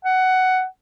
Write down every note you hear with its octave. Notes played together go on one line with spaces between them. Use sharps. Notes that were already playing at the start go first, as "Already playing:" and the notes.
F#5